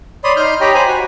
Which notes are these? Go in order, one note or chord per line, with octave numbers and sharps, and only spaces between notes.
C#5 D5 B5 C6 D#6
D#4 C6 F6 G6
G4 C#5 D#5 G5 A#5 B5
C5 G#5 A#5 B5
F#4